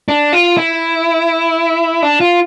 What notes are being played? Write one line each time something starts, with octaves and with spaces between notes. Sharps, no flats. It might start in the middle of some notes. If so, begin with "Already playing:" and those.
D4
F4
E4
D4
F4